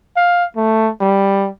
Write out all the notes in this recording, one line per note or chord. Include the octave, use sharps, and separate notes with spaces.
F5
A3
G3